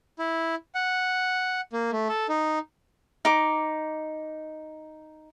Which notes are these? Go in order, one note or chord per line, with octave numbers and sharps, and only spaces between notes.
E4
F#5
A#3
A3
A4
D#4
D#4 D6